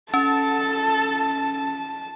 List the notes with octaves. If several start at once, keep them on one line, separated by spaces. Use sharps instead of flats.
C#4 A4 A5